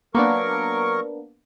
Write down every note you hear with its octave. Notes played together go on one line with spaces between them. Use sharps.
F#3 A#3 B3 D4 A#4 C#6